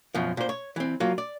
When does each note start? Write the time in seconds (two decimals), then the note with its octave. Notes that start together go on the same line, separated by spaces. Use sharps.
0.14 F#2 B2 F3
0.37 A#2 C5
0.49 C#5
0.76 E3 C4
1.00 F#3 A#3 F4
1.18 D5